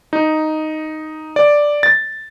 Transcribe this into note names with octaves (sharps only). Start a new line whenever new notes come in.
D#4
D5
A6